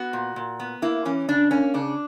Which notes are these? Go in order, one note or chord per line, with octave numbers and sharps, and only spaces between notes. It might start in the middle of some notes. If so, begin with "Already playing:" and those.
Already playing: B3 F#4
A#2
A#2
B3
A#3 E4
E3 C#4
C#3 D4
A#3 C#4
C#3 D4